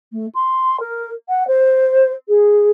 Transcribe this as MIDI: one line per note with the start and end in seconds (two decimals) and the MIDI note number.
0.12 0.26 57
0.34 0.79 84
0.80 1.10 70
1.29 1.46 78
1.47 2.12 72
2.28 2.70 68